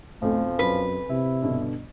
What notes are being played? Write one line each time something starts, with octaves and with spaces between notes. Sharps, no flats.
B1 F2 F3 A3
F#2 B4
C3 E4
G2 B2 D3